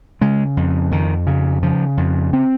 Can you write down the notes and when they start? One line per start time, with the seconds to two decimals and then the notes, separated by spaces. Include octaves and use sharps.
0.21 C#3 G#3
0.57 F2
0.92 F2 D#3
1.27 C#3
1.63 C#3 F3
1.97 F2
2.33 C4